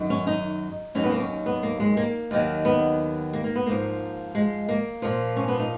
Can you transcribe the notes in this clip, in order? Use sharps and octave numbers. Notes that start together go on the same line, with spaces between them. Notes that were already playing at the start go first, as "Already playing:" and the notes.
Already playing: F#2 D#3 F#3
C#4
D#4
D#2 D#3 F#3 C#4
B3
A#3
C#4
B3
A#3
G#3
A#3
D#2 D#3 F#3
B3
A#3
A#3
B3
G#2 F3 A#3
G#3
A#3
A#2 F3
C#4
B3
D#4